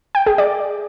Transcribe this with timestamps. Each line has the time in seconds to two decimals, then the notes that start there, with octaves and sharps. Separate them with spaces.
0.15 G5
0.26 G#4
0.38 D5